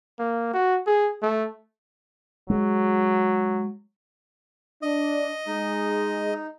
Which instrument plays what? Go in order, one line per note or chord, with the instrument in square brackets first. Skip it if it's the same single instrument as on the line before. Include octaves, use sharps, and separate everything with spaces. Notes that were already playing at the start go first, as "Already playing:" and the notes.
[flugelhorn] A#3
F#4
G#4
A3
[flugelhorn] F#3 [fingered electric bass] G#3
[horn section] D4 [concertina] D#5
[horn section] G#3 [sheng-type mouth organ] D#4